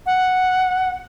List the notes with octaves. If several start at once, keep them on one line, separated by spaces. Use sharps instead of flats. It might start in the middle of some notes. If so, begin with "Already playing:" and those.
F#5